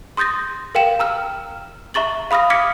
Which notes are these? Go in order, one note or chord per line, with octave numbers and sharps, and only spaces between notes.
C6 D#6 G6 A6 A#6
A#4 F5 G5 E7
A#5 E6 F6
E5 A#5 C#6 A6 F#7
F5 B5 D#6 F6 A#6
D6 D#6 F6 G#6 B6 C#7